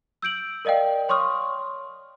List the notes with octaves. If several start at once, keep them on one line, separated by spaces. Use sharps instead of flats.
E6 G6 D7 F#7
A#4 D5 D#5 F5 G5
C#5 C6 C#6 D#6 F6